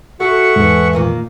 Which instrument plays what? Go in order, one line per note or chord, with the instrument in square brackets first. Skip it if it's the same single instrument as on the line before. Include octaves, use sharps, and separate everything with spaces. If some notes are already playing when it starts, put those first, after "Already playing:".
[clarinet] F#4 [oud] A4 [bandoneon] E5 F#5 C#6
[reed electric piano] E2 G#2 [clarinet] E3
[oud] A#2 D#3 A#3